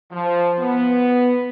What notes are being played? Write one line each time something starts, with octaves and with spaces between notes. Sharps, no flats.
F3
B3